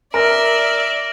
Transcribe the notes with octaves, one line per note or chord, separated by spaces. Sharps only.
A#4 D5 E5 F6 A#6 D7